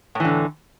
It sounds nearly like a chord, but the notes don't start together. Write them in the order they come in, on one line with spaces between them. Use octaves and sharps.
A2 E3 D3